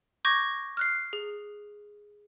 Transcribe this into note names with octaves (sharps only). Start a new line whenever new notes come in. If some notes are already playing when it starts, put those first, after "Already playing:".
C#6 D6 G6 G#6 A#6
F6 F#6 C7
G#4